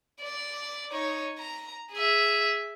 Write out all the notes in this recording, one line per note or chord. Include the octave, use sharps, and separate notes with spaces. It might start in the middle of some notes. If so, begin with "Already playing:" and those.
D5
D#4 C#5
A#5
G#4 E5